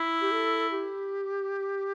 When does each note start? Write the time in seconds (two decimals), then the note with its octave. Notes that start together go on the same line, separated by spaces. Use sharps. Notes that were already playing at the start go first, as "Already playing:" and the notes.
Already playing: E4
0.21 G4
0.31 A4
0.71 G4